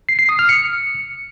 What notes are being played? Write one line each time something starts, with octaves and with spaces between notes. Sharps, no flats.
C7
C7
D#6
F6
C#7